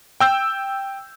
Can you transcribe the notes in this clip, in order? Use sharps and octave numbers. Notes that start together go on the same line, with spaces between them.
G5 E6 G6